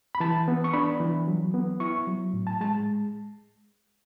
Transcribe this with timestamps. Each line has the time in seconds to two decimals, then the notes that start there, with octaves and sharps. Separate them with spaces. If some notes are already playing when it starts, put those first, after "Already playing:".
0.15 B5
0.20 E3 A5
0.48 B3
0.64 C#6
0.73 D4 B5
1.00 E3
1.28 F#3
1.54 B3
1.80 E4 C#6
2.07 F#3
2.33 A2
2.47 A5
2.61 G#3 A5